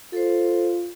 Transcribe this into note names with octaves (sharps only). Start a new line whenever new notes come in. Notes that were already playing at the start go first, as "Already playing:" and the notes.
F4 A4 C5